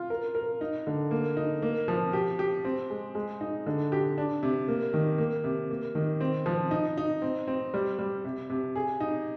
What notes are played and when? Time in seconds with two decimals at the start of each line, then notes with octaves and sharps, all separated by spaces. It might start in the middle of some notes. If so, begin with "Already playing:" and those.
Already playing: F4
0.10 A#4
0.35 A#4
0.61 D#4
0.87 D3
1.11 A#3
1.37 D#4
1.62 A#3
1.88 F3
2.13 G4
2.39 G4
2.65 C4
2.90 G#3
3.15 G#3
3.41 D#4
3.66 D3
3.92 G4
4.18 D4
4.43 C3
4.68 A#3
4.94 D#3
5.18 A#3
5.44 C3
5.70 A#3
5.95 D#3
6.21 C4
6.46 F3
6.71 D#4
6.97 D#4
7.22 C4
7.48 C4
7.74 G3
7.99 G3
8.25 C3
8.50 C3
8.76 G#4
9.00 D#4